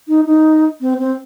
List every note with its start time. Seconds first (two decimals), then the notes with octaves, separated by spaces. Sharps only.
0.08 D#4
0.26 D#4
0.81 C4
0.99 C4